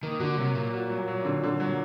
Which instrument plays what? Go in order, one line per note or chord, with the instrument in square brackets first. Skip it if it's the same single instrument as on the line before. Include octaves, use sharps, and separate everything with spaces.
[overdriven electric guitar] D#3 [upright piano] A#3
[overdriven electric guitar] D3 [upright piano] F#4
[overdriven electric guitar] C3 [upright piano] F#3
[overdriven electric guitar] A#2 [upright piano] A#3
[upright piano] F#4
F#3
F#3
D3
D3
F#3